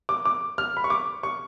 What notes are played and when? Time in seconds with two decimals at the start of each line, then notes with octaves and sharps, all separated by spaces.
0.09 D6
0.25 D6
0.58 F6
0.77 B5
0.84 C#6
0.90 D6
1.23 C#6